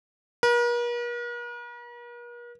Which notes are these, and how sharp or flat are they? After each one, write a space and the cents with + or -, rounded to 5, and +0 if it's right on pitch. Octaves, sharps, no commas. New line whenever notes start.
A#4 +45